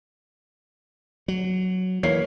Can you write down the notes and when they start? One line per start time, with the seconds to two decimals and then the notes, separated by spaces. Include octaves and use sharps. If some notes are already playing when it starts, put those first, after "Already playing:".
1.28 F#3
2.03 E3 A#3 C#5 C7